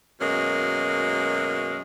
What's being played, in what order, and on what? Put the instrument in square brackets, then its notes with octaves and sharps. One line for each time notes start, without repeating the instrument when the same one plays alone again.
[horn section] F#2 B2 G#3 A#3 C#4